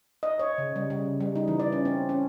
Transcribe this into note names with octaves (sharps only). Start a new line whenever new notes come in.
D#5
C#5
C#3
G3
C#3
G3
D#4
E3
D5
C#4
C4
C#4